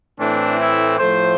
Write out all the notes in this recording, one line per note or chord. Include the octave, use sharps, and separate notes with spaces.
A2 E3 A3 C4 D4
E4
A2 F3 A3 C5